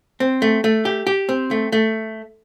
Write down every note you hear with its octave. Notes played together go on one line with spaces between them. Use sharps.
C4
A3
A3
G4
G4
C4
A3
A3